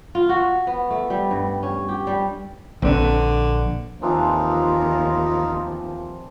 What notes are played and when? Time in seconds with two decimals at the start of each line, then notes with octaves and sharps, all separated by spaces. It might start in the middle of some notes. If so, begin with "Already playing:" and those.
0.15 F4
0.29 F#4
0.67 B3
0.90 A3
1.10 G3
1.31 G2
1.63 C#4
1.89 G4
2.07 G3
2.82 A#1 D3 C4 D4 B4
4.02 D#2 E3 F3 C4 D4 D#4 F4